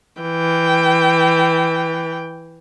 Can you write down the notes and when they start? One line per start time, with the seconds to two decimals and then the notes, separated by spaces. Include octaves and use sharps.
0.21 E3 G5